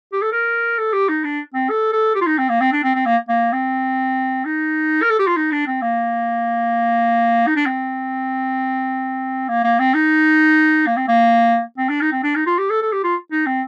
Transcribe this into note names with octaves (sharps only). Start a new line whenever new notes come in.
G4
A4
A#4
A4
G4
D#4
D4
C4
A4
A4
G4
F4
D#4
C4
A#3
C4
D4
C4
C4
A#3
A#3
C4
D#4
A#4
A4
G4
F4
D#4
D4
C4
A#3
D#4
D4
C4
A#3
A#3
C4
D#4
A#3
C4
A#3
C4
D4
D#4
C4
D4
D#4
F4
G4
A4
A4
G4
F4
D#4
C4